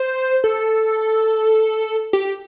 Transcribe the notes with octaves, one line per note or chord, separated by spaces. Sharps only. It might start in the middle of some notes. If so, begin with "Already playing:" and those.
Already playing: C5
A4
G4